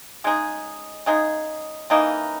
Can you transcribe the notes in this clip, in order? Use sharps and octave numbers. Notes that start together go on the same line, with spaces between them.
C#3 G#3 D#4 G#4
C#3 G#3 D#4 G#4
C#3 E3 A#3 D#4